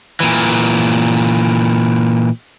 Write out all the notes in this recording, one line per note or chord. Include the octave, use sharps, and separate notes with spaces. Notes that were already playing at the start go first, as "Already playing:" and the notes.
A#2 E3